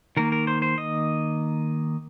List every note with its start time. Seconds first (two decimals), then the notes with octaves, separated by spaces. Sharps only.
0.17 D#3 A#3 A#4
0.32 A#4
0.47 C5
0.62 C5
0.78 D#5